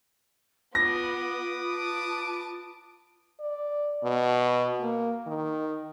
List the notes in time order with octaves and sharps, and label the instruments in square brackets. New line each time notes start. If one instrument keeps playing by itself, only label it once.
[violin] B3 [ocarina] F4 [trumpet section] B4 D6 D#6 [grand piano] A#6
[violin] A5 D7
[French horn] D5
B2
A#3
D#3